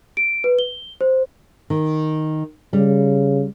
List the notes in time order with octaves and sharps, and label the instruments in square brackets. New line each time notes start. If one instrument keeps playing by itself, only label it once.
[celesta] D7
B4
G7
C5
[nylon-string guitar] D#3
[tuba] C#3 [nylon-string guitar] G3